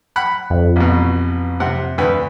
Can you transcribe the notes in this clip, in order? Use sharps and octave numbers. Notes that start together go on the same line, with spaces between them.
F#5 B5 F#6
F2
A1 B2
C3 F#5
D2 B4